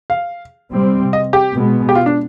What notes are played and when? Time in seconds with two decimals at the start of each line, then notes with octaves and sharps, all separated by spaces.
0.10 F5
0.72 C3 G3 C4
1.13 D#5
1.33 G4
1.54 B2 G#3 B3
1.89 G4
1.95 F4
2.06 D4